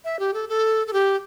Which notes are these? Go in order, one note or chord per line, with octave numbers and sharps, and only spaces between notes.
E5
G4
A4
A4
A4
G4